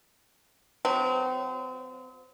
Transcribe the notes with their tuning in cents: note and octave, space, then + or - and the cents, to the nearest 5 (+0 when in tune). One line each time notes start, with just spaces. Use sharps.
F#3 -40 C4 -35